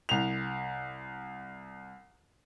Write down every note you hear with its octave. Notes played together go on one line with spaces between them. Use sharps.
C2 F7